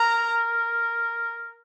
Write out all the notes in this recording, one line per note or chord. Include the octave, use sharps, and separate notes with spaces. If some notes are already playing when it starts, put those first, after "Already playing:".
Already playing: A#4 A#5